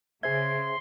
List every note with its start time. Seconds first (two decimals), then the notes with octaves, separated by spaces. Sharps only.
0.23 C#3 G#4 C5 E5 C6 G#6